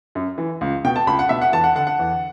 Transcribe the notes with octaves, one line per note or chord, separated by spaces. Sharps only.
F#2
E3
C#2
B2 G5
A5
C#2 B5
F#5
B2 E5
F#5
E2 A5
F#5
D3 F#5
F#5
E2